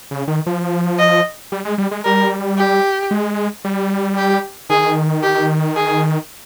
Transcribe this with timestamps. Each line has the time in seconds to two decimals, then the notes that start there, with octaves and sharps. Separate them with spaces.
0.11 C#3
0.28 D#3
0.46 F3
0.99 D#5
1.52 G3
1.65 G#3
1.78 G3
1.91 G#3
2.05 G3 A#4
2.58 G4
3.11 G#3
3.65 G3
4.17 G4
4.70 D#3 G#4
5.23 G4
5.76 G#4